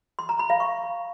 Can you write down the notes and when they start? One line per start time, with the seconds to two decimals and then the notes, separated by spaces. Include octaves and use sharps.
0.19 C6
0.29 A#5
0.39 B5
0.50 F5
0.60 C#6